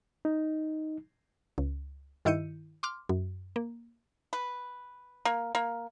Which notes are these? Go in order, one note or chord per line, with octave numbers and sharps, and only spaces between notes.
D#4
C#2
G2 D#3 E4 G6 C#7 D#7
C6 D6 F6
F#2
A#3
B4
A#3
A#3